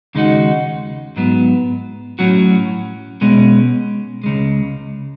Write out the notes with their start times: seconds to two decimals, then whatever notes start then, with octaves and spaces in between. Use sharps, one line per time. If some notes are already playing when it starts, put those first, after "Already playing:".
0.15 D#2 C#3 G#3 D#4 F#4
1.16 G#2 F#3 B3
2.19 A2 F#3 C#4 F#4
3.21 B2 G#3 C#4
4.24 C#2 C#3 G#3